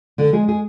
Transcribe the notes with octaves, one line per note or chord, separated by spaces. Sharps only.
D3 D4
G#3 G#4
G#3 G#4